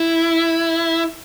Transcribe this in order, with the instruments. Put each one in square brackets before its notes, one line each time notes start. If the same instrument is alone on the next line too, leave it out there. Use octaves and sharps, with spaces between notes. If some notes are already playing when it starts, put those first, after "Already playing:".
Already playing: [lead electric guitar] E4